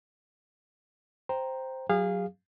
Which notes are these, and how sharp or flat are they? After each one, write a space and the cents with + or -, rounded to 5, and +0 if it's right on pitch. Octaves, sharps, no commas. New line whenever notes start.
C5 +0 G5 +0 A#5 +0
F#3 +0 G#4 -30 F5 +0